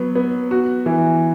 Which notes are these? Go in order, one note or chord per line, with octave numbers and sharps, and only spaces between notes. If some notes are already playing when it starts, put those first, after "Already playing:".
Already playing: F#3 B3
B3
F#4
E3